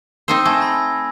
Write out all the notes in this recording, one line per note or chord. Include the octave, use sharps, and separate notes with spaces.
C4 D#4 C5 E6
A3 G#5 G#6 A#6
B5 A#6